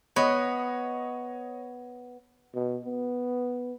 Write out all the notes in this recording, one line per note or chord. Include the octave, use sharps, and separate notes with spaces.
B3 C#5 D#5
B2
B3